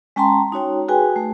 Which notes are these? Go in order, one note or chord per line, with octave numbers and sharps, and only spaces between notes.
G#3 C#4 G5 A5 A#5 C6
D#4 F#4 C#5 G5
F#4 G#4 B4 G5 G#5
A3